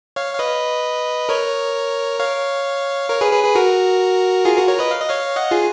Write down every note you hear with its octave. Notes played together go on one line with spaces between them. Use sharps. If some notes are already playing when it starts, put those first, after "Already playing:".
C#5 F5
F5
B4 D#5
A#4 C#5
C#5 F5
A#4 C#5
G#4 B4
G#4 B4
G#4 B4
F#4 A#4
F4 G#4
F#4 A#4
A#4 C#5
B4 D#5
F5
D#5
C#5 F5
D#5 F#5
F4 G#4